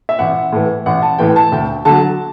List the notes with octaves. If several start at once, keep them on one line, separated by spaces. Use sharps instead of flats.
E5
A1 F#5
A2 E3
A1 F#5
A5
A2 E3 G5
A5
D2 G5
D3 F#3 A5